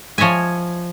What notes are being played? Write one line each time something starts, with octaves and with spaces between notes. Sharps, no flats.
F3 C#5 D#5 E5 G#5